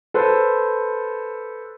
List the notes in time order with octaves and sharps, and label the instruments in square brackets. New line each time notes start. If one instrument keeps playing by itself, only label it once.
[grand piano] A4 B4 C5